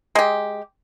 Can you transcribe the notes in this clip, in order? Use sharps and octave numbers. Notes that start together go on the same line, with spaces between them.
G#3 G4